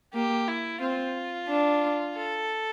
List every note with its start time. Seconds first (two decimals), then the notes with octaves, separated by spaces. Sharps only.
0.14 A#3 G4
0.48 E4
0.81 C4 F4
1.49 D4
2.16 A4